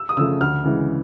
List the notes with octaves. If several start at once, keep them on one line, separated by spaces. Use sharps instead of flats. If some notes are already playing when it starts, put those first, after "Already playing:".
Already playing: E6
D#6
C#3 F3 A3 E6
D2 F6
C#3 E3 G#3